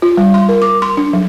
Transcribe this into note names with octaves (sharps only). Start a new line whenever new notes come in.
F4
G3
C6
A#4
D6
C6
D4
F#3